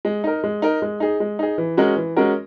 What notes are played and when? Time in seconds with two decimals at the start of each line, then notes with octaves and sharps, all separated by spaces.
0.05 G#3
0.24 D#4 A#4
0.44 G#3
0.62 D#4 A#4
0.82 G#3
1.00 D#4 G#4
1.20 G#3
1.39 D#4 G#4
1.58 E3
1.77 G#3 C#4 F#4 A#4
1.97 E3
2.17 G#3 C#4 F#4 A#4